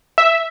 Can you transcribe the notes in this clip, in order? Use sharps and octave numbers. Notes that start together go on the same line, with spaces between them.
E5